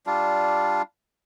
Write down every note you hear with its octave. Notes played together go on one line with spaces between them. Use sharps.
G3 D4 F4